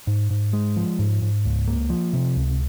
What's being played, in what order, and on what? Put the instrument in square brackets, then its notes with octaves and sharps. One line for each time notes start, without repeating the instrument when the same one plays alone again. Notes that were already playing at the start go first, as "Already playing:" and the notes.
[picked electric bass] G#2
G#2
G#3
F3
G#2
G#2
C#2
A#3
F3
C3
C#2